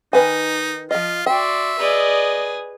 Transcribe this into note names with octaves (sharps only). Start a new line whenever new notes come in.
D#3 D#4 B4 G#5
F3 F4 D#5
F#4 D5 E5 G5 C6
G#4 B4 D5 D#5